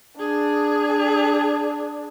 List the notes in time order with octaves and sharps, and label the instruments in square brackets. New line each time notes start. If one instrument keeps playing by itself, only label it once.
[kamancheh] D4 [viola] G#4